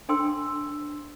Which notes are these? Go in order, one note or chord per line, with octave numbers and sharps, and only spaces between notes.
D4 A4 C5 G5 C6 E6